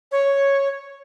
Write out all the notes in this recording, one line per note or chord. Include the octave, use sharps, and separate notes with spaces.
C#5